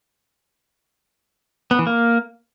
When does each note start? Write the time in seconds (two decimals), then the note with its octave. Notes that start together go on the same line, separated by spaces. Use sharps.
1.71 B3
1.79 E3
1.87 A#3